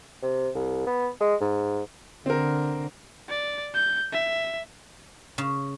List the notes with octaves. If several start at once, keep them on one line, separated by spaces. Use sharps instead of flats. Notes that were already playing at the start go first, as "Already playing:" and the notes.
C3
C2
B3
G#3
G#2
D3 C4 A#4
D5
G6
E5
C#3